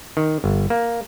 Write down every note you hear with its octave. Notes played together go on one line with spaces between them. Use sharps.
D#3
G1
A#3